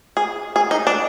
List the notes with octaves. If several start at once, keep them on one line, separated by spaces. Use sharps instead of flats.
G#4
G#4
D#4
D4